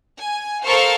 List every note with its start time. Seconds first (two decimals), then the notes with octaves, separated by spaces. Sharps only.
0.20 G#5
0.65 A4 A#4 C5 F5 C#6